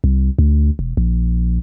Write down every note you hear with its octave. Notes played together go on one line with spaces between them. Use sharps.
C2
D2
E1
A#1